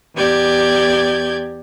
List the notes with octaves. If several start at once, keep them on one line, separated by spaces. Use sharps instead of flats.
E2 G4 D5 G6 G#6